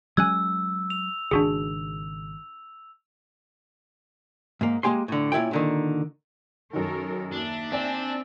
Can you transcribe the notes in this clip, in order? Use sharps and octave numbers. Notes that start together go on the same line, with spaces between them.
F#3 G#3 C#4 G#5 E6 F#6 G#6
F7
G#1 C#3 D4 F#4 G#4
G#2 A#3
G#3 A#3 G4 G#5 C6
A2 D3
A#2 C#4 E4 C#5 G5
A#2 D3 D#3
F#2 D#3 A4 A#4 C#5
D#2 D4 D#4 E5
C4 D5 G#5